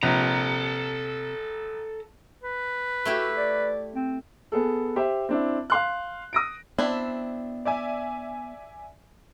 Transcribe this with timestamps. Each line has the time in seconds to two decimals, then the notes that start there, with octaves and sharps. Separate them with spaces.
0.03 A#1 C3 A4 A#5
2.43 B4
3.05 A3 E4 F#4 G4
3.37 D5
3.95 C4
4.52 B3 G#4 A4
4.96 G4 C5 E5
5.29 C4 D4 E4
5.70 F5 C6 F#6
6.33 D#6 A#6 D7
6.78 B3 C4 D4 E4
7.65 D5 E5 G#5